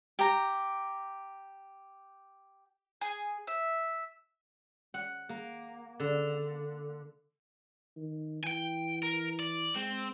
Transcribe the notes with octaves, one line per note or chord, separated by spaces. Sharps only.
G4 A#5
G#4
E5
F#5
A#3
D3
D#3
E3 G5 G#5
A#4
D5
G#3 C4